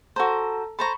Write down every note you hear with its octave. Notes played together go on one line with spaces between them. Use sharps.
F#4 A4 C5 A5 A#5
A4 C5 A#5 B5 C#6